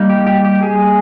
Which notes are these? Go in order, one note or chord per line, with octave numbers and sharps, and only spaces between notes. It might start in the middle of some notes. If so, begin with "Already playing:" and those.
Already playing: G3 A#3 D#4
G4
G4
G4
G#4